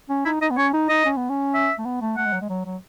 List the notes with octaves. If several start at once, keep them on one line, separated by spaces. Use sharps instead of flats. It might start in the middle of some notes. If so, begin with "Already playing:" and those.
C#4
D#4 E4
D#4 D#5
B3
C#4 C#5
D#4
D#4 D#5
C#4
B3
C#4
E5
A3
B3
A3
A3 F#5
G#3
F#3
G#3
F#3
F#3